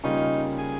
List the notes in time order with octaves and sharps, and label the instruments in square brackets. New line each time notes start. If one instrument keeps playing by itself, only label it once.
[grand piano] C#3 G3 A#3 C#4 F4 [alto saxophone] D#4
[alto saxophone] G#4